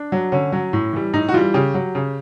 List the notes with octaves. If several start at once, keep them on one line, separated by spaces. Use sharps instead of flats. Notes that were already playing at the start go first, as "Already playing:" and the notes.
Already playing: D4
F#3
D3 C#4
F#3
A2
E3 G3
A2 D#4
F#4
E3 G3 F4
C#3 G4
F#3
C#3